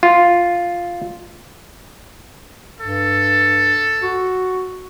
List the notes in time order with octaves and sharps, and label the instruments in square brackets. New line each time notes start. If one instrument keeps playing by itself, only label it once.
[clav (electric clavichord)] F4
[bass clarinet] G2 [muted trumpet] A4
[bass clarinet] F#4